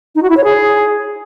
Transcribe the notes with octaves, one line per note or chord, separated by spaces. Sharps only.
D#4
F#4
E4
C#5
G#4